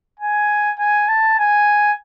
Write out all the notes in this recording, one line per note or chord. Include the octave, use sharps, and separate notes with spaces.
G#5
G#5
A5
G#5